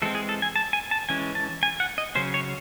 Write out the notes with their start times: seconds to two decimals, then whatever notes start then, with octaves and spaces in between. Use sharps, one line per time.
0.02 E3 G#3 C4 A4
0.15 G#4
0.29 A4
0.42 G#5
0.56 A5
0.73 G#5
0.91 A5
1.09 E3 G#3 C#4 G#5
1.35 A5
1.63 G#5
1.80 F#5
1.98 D#5
2.15 C#3 F#3 C#4 C5
2.34 C#5